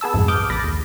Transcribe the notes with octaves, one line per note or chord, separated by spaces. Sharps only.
B3 G#4 A5 E6
C2 F2 G#2 G#3
D6 D#6 F6 G6
A#1 A#2 B5 A6 A#6
D#2